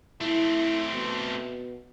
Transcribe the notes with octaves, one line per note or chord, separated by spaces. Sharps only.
A3 C4 E4
B2